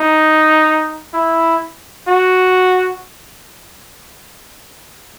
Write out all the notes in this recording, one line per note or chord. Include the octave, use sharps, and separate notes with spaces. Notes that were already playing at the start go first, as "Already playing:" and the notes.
Already playing: D#4
E4
F#4